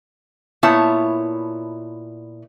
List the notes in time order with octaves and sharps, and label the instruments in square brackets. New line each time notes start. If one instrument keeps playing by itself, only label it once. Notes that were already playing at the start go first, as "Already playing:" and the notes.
[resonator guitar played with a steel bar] A#2 B3 E4 C#5 A5